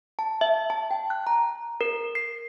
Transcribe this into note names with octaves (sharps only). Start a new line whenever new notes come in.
A5
E5
A5
G5
F#6
A#5
A#4
C7